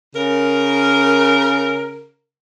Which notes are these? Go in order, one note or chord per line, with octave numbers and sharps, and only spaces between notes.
C#3 A#4